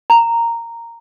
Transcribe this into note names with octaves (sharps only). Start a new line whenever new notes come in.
A#5